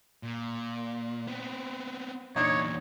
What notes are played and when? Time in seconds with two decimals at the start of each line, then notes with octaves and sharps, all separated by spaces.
0.23 A#2
1.27 B3 C4
2.36 E2 A#2 D4 D#4 C#5